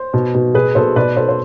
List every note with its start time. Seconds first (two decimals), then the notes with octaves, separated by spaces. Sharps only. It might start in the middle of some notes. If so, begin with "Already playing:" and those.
Already playing: C5
0.14 B2
0.35 B2
0.55 B2 G#4 B4
0.75 B2 A4 C5
0.96 B2 B4 D5
1.17 B2 A4 C5
1.28 C5